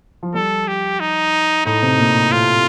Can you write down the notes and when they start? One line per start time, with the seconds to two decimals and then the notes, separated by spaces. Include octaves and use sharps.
0.23 F3
0.34 G3 A4
0.68 G4
1.00 D#4
1.65 A2 A3 D#4
1.82 C3 C4
1.98 A#2 A#3
2.31 A2 A3 F4